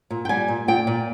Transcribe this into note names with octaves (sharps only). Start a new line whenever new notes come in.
A#2
G5
G3 G#5
A#2
A#2 G5
A#2